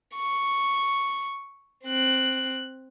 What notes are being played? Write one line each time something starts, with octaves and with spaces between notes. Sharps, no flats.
C#6
C4 F#6